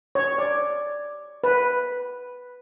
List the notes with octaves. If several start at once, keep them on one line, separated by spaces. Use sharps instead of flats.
C#5
D5
B4